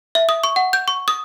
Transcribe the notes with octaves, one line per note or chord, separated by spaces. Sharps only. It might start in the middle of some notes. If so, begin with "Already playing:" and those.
E5
D#6
C#6
F#5
G6
C#6
D#6